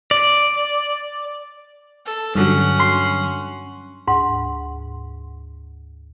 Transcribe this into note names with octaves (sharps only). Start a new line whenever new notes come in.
D5
A4
G2 D3 F#3 C#4 F#5
C6 C7
D2 G#2 F#5